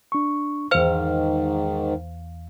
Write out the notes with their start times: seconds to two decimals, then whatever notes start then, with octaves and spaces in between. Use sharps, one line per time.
0.12 D4 C#6
0.71 E2 G#2 D#3 C5 F5 F6